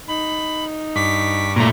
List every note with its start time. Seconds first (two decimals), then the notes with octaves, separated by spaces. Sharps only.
0.08 D#4 B5
0.96 G2 C#6 D6 B6
1.56 A#2 A3 A#5